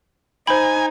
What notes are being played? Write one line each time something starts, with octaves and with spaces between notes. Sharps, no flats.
D#4 C5 G#5 B5